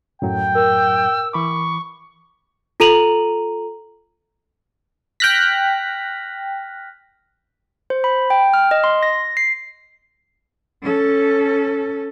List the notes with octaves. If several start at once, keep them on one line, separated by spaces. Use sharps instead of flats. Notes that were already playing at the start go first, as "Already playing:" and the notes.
F#2 A2 F#3 G5
A#4 E6
E3 B5 C#6 D6
F4 A4 A#5 D#7 F7 F#7
G5 F6 F#6 A#6 B6
C5
B5
G5
F6
D#5
C6
A#6
C7
C#4 A4